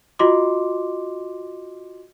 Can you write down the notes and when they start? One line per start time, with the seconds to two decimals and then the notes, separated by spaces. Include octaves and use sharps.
0.19 F4 F#4 D#5 C6 D6